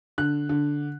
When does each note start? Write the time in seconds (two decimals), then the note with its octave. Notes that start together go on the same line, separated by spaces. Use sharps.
0.18 D3 F#6
0.49 D3